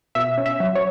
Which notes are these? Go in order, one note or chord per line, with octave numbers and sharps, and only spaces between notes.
B2 E5
C#4
E5
F#3
C#5